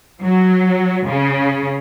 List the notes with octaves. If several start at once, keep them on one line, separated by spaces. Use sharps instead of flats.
F#3
C#3